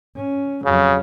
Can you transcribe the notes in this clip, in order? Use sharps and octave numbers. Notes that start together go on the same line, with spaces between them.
C#4
F2 C#3 F#3